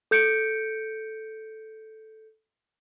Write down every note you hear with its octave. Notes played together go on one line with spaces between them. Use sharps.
A4 G6 C#7 D7